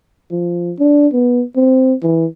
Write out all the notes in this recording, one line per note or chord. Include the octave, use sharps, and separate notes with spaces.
F3
D4
B3
C4
E3